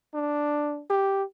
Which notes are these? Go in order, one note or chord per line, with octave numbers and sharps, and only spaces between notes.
D4
G4